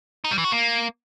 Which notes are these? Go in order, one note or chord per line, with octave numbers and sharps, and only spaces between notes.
D#4
G3
E3
F#4
A#3